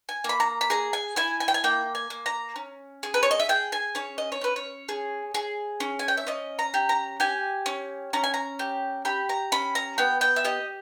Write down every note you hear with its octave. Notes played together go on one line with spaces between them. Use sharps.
G#5
A#3 B5
A#5
B5
G#4 A#5
G#5
E4 G#5
G#5
G5
G#5
A#3 G5
G#5
A#3
A#5
C#4
G#4
B4
C#5
D#5
E5
G#4 G5
G#5
C#4 C#5
D#5
C#5
C#4 B4
C#5
G#4
G#4
C#4
G#5
G5
E5
C#4 D#5
A#5
G4
A#5
G4 G#5
C#4
C#4 A#5
G#5
A#5
G4
G4 B5
A#5
C#4 B5
A#5
B3 G5
G5
E5
G4 D#5